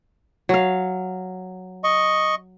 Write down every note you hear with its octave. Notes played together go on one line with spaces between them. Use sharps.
F#3 F5
D#5 C#6